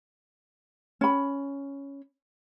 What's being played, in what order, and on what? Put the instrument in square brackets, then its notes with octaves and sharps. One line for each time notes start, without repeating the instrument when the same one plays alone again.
[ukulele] C#4 B5